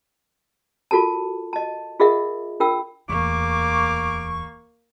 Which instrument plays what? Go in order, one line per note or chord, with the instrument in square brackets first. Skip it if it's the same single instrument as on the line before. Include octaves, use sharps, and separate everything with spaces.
[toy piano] F4 F#4 A4 A#4 A5
D#5 A5
F4 G#4 A#4 D#5 E5 F#5
D4 F4 A#4 G5 E6
[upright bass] D1 E2 [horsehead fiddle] A#3 [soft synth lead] C#6 [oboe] D6